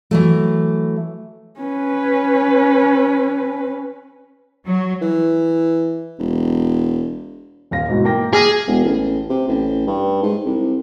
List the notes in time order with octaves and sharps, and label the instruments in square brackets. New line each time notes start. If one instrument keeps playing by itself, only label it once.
[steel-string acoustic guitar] E3 F#3 A3
[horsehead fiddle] C#4 B4
[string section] F#3
[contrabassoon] E3
E1
[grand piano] D#1 F5 A#6
G#2 B2 E3
A#3 G5 A#6
[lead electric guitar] G#4 [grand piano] D6 F6 A#6
[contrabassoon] E1
A1
C3
A1
G2
G#2
C2